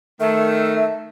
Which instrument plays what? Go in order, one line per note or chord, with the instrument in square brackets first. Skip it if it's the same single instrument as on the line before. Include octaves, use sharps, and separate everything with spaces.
[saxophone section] D#3 A3 [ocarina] E5